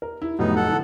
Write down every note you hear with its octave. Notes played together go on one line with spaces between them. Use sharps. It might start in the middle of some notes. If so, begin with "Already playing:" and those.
A#4
E4
F1 A2 F#3 B3 D#4
A4 F#5
D3 E3